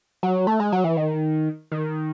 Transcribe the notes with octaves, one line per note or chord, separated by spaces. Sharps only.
F#3
A3
G#3
F#3
E3
D#3
D#3